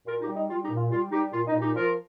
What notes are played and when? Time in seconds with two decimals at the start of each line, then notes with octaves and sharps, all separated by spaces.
0.06 A#2 F4 A#4
0.21 D#4 G4
0.28 G3
0.35 D#4
0.49 G3 F4
0.63 D#4 G4
0.70 A#2
0.77 F4
0.91 G3 F4
1.11 G3 D#4 G4
1.32 A#2 F4
1.47 D#4
1.53 A#2
1.60 D#4 G4
1.75 F3 F4 A#4